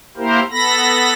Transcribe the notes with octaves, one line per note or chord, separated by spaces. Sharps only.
A#3 E4 G4 A#4 C5
B3 A4 B5 A#6